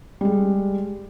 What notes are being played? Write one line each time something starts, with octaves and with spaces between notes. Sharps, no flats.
G3 G#3